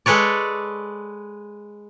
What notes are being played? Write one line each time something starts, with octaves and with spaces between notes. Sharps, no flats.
G#3 A4 B4 C#5 D5